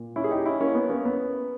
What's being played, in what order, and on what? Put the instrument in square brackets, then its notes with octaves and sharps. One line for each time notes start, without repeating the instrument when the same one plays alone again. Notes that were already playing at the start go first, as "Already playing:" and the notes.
Already playing: [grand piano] A#2
C#4 E4
G#4
D#4 G4
C#4 E4
A#3 C#4
B3
A#3 C#4
B3